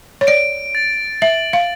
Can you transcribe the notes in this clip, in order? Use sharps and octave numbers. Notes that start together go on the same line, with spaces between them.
C#5
D5 D7
A6
E5 F#7
F5